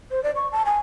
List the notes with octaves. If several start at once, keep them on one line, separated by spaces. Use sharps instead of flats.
C5
D5
C#6
A5
G#5